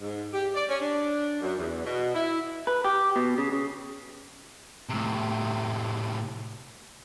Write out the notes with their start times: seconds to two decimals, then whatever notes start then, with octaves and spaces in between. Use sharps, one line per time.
0.01 G#2
0.33 G4
0.54 D5
0.69 C#4
0.81 D4
1.41 F#2
1.58 E2
1.85 B2
2.15 E4
2.67 B4
2.85 G4
3.16 B2
3.38 C#3
3.52 C#3
4.89 A2 C3